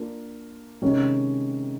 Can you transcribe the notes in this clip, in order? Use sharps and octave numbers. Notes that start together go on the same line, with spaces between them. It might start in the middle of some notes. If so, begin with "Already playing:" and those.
Already playing: A#3 D4 F4
C3 D#3 G#3 C#4